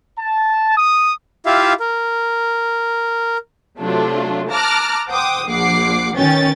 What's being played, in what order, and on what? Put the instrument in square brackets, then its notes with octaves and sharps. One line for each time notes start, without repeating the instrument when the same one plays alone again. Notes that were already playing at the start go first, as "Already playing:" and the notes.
[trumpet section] A5
D#6
[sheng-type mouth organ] E4 F4 G4 E5 F5
A#4
[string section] C3 F#3 A3 D4 F4
A5 A#5 D6 F6 F#6 A#6
C5 F#5 G5 D6 D#6
A#1 F3 F#5 D6 C7
B2 D#3 C#4 C#5 G5 A6